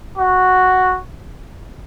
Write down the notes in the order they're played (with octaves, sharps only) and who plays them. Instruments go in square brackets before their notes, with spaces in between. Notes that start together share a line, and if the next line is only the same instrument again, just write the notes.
[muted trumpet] F#4